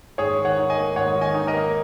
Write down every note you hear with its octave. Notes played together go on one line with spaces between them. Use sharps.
G#2 G#4 C#5
D#3
C#5 F#5
D#4
D#5 G#5
A#3
G#2 C#5 F#5
D#3
D#5 G#5
D#4
A#4 D#5
A#3